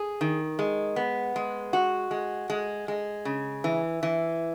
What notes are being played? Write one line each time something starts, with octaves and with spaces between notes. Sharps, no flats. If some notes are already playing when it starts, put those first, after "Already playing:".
Already playing: G#4
D#3
G#3
B3
G#3
F#4
G#3
G#3
G#3
C#3
E3
E3